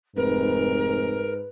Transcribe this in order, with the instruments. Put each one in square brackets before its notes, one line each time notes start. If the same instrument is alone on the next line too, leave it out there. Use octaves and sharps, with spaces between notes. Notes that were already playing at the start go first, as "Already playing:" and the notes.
[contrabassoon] F1 [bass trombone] G#2 [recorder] A#4 [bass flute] B4
[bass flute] B4